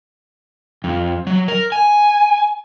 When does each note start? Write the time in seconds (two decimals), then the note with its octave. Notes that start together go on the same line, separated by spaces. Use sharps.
0.84 F2
1.27 F#3
1.48 A#4
1.72 G#5